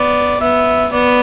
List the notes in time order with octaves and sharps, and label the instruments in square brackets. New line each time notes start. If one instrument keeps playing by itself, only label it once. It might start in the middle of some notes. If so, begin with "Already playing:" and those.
Already playing: [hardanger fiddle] B3 [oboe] D5
[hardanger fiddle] B3 [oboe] E5
[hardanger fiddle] B3 [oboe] D5